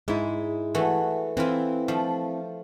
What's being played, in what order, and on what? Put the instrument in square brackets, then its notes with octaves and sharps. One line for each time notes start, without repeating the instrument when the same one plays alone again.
[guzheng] G#2 [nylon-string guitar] G#3 E4
[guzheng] E3 A3 F#4
[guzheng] E3 F4 [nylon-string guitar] C4 E4
[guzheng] F3 A3